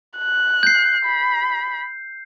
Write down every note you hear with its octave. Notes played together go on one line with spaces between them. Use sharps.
F#6
G6 C7
B5